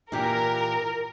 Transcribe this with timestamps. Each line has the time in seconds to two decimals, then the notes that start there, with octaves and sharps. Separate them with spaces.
0.12 A#2 E3 G4 A#4